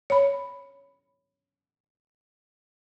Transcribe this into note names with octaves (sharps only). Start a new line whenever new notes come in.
C#5 B5